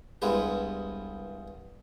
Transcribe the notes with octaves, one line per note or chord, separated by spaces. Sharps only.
C2 G2 G#3 B3 G#4